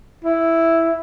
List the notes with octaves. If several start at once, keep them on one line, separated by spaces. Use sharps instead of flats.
E4